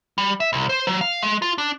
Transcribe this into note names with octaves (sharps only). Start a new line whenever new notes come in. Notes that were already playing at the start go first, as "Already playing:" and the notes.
G3
E5
C2
C5
F#3
F5
G#3
F4
D4